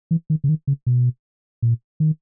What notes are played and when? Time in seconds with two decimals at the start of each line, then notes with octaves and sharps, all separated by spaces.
0.11 E3
0.30 D#3
0.44 C#3
0.49 D#3
0.67 C#3
0.87 B2
1.62 A#2
2.00 D#3